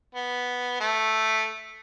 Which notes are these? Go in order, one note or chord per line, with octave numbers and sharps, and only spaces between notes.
B3
A3